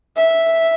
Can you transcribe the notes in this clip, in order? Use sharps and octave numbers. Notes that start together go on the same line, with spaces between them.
E5